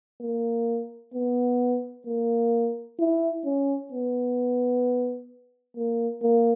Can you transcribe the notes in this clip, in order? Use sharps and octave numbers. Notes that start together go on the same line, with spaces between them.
A#3
B3
A#3
E4
C#4
B3
A#3
A#3